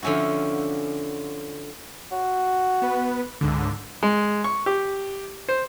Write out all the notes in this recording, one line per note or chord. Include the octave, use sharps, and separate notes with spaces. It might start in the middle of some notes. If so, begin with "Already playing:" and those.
D3 F3 C#4 E4 F#4
F#4
B3 B4
C#2 G#2 D3
G#3
C#6
G4
C5